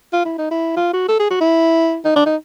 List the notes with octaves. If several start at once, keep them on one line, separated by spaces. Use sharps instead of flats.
F4
E4
D#4
E4
F4
F#4
A4
G#4
F#4
E4
D#4
D4
D#4